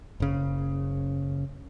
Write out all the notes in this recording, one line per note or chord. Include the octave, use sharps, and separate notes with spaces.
F#1 C#3